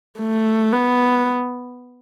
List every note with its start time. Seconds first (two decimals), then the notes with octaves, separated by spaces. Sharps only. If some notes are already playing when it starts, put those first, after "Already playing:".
0.19 A3
0.72 B3